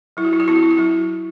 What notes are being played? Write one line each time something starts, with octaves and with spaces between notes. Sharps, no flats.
F#3 E4
F#4
E4
F#4
C4 E4
F#4
E4
F#4
F#3 E4